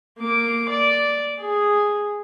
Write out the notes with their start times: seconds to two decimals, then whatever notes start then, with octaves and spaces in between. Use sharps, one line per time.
0.18 A#3 D6
0.69 D5
1.40 G#4